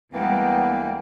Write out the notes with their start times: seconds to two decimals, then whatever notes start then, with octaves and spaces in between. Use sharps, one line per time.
0.13 D2 E3 G3 G#3 A#3 B3 G5